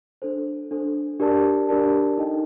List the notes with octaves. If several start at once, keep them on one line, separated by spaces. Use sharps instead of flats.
D4 A4 C5
D4 A4 C5
D4 G4 A#4 D5 A5
D4 G4 A#4 D5 A5
D#4 A4 D#5 G5